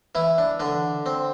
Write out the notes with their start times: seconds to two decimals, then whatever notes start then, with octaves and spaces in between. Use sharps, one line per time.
0.15 E3 E4
0.38 D4
0.60 D3 D4
1.06 C4